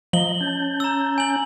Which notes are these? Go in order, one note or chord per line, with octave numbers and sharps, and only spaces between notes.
F3 D#5 A#5 F#7 G7
C#4 A5 G6
A#5 E6
G#5 F#7